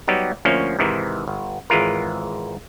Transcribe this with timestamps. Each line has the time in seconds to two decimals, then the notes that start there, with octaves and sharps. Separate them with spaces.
0.08 F#3 G3 B3 D#4 G4
0.45 D2 F3 A#3 C#4
0.79 G#2 C3 D#3 E3
1.27 G1
1.70 G#1 E3 G#3 F4 A#4